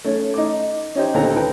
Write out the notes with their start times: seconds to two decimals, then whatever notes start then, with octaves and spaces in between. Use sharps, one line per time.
0.04 A3 C#4
0.34 D#4 D6
0.95 C#4 D#4 G4 C5
1.14 D2 A#2 D#3 C4 A4 A#5
1.35 F4 B4 G5